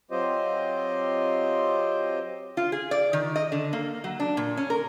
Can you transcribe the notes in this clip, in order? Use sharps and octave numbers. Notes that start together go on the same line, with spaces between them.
F#3 C4 F4 G4 C5 D#5
F4
G#4
D5
D#3
D#5
D3
A#3
F#3
D4
A#2
C#4
A#4